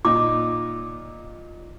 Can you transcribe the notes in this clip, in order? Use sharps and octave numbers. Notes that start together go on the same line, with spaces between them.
A#2 D#4 D6